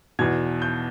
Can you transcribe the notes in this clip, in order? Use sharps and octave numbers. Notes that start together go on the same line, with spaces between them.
E2 B2 G#6
G6